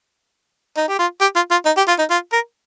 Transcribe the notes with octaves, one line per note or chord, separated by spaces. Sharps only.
D#4
G4
F4
G4
F4
F4
D#4
G4
F4
D#4
F4
A#4